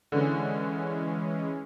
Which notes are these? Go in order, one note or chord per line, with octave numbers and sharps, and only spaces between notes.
D3 E3 G#3 C#4